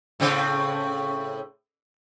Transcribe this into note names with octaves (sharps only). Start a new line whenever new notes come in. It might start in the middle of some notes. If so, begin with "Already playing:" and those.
A2 C#3 C4